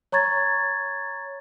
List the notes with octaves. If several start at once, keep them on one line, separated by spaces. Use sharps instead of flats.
C#5 A#5 C#6 G#6 A6